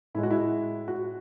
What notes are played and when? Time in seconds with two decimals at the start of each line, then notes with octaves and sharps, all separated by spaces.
0.15 A2 E4
0.18 G#3
0.23 F#4
0.30 E4
0.88 F#4